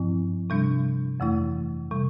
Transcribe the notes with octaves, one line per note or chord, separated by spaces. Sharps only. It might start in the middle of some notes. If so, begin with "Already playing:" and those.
Already playing: G2 F3 C4 E4
C3 G3 D4
F2 E3 A3 E4
C3 G3